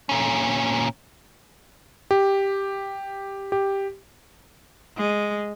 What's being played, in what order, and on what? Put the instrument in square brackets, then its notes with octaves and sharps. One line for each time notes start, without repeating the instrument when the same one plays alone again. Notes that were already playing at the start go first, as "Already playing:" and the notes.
[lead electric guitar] A#2 C#4
[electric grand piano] G4
G4
[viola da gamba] G#3